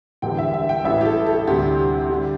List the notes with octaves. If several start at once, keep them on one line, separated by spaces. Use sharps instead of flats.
E1 E2 D3 G3 G5
E5
E5
G5
A1 A2 E3 G3 E5
G4
A4
A4
D2 C3 G3 G4
D3 G3